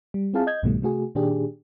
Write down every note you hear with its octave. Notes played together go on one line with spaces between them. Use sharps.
G3
C4 E4 F4 G#4 F5 A5
D#5 G6 G#6
C2 G#2 B2 D#3 G3 A3
C3 A3 F#4 G#4
A#2 D#3 D4 G4 G#4